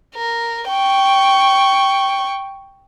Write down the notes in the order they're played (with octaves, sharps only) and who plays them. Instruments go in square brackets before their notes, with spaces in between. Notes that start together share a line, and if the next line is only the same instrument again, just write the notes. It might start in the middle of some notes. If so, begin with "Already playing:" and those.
[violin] A#4
G5 C#6